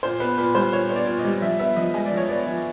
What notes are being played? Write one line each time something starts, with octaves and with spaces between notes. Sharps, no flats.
A#2 C5
B3 B4
A#2 B4
G3 C5
A#2 C#5
B3
D5
A#2
D#5
G3
F3 E5
B3 E5
F3 D#5
G#3 D#5
D5
F3
C#5
B3 D5
F3